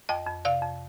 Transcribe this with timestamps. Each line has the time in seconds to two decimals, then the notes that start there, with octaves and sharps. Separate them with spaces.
0.09 F2 D#5 G5
0.27 F2
0.45 C3 D5 F5
0.62 F2